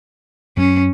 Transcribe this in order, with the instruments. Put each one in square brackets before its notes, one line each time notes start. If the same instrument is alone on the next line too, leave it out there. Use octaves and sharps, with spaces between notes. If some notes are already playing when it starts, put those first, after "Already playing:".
[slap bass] F#2 F#3 [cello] C#4